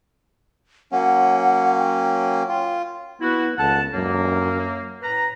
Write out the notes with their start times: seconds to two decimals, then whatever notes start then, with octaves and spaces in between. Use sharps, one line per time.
0.92 F#3 A#3 C#4 F#5
1.79 G5
2.49 F4
3.21 B3 E4 F#4
3.58 C#2 A4 F#5 A5
3.94 F#2 F#3 A#3
5.02 A2 B4 A#5